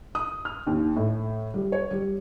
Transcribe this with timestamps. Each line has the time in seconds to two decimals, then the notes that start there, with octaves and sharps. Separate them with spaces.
0.15 D#6
0.45 F6
0.67 D#2
0.96 A2
1.54 G3
1.72 C#5
1.91 G3